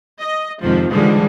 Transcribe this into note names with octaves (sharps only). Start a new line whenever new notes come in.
D#5
F2 G#2 C3 D#3 F3
G#2 D3 E3 F3 G3 G#3